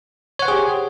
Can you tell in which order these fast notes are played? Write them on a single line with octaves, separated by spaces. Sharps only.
C#5 F#5 C5 G#4 G4